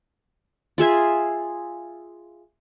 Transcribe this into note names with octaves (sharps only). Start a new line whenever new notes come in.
F4 G#4 E5 G#5